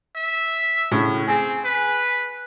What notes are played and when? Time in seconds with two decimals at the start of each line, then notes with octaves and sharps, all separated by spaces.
0.16 E5
0.92 A2 C#3
1.27 C4 G#4
1.65 B4